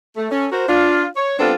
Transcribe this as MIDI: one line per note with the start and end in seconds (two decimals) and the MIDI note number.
0.17 0.28 57
0.31 0.46 61
0.31 0.46 69
0.52 0.67 66
0.52 0.67 70
0.52 0.67 72
0.68 1.06 62
0.68 1.06 65
1.17 1.35 73
1.39 1.54 55
1.39 1.54 59
1.39 1.54 60
1.39 1.54 62
1.39 1.54 65
1.39 1.54 69